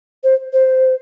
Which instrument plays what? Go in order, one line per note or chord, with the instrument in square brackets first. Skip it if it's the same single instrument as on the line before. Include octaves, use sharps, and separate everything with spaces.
[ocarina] C5
C5